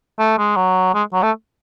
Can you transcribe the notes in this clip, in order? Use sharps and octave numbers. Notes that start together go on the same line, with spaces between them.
A3
G#3
F#3
G#3
F#3
A3